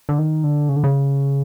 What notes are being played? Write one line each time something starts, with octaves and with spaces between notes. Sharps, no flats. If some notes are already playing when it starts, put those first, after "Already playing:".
D3
D#3
D3
C#3
D3
C#3